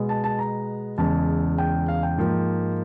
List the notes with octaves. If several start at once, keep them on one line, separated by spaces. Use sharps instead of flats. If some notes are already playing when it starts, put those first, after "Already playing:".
Already playing: B2 G#3 B3
A5
A5
A#5
E2 C#3 E3 G#3 A5
G5
F5
G5
G#2 F3 A#3